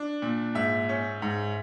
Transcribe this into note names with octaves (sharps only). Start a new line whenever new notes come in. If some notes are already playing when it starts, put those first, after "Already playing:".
Already playing: D4
A#2
G#2 E5
C#4
G#2